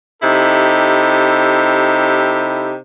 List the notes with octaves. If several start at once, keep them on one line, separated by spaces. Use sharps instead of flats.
C3 D#4 E4 G4 A4